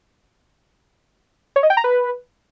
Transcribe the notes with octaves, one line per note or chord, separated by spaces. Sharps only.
C#5
D#5
G5
A#5
B4